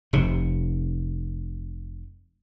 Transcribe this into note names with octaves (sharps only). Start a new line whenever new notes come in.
F1 C3